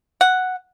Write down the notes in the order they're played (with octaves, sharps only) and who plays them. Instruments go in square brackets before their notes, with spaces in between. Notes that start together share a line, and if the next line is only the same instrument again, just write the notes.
[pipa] F#5